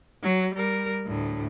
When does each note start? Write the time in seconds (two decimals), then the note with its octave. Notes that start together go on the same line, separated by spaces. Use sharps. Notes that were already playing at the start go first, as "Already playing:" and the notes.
0.23 F#3
0.55 G3 A#4
1.06 D2 A2